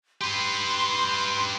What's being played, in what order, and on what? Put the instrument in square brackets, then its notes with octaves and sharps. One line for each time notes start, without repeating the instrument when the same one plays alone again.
[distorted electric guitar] G4 B4 [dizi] C6